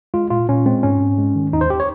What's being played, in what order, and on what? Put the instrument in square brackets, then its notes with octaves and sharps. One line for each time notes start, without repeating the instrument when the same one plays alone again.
[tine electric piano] G#3 F4
A#2 F4
A#2 C#4
G#3 C4
G#2 C#4
G#2
G#3
D#3
D#2 D#4
C5
G4
C#5